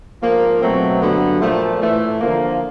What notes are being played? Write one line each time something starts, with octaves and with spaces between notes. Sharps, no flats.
G#2 F3 A#3
B2 F#3 A3 C4
G2 D3 F#3 B3
A#2 F3 A3
A2 E3 A3
D3 F3 A#3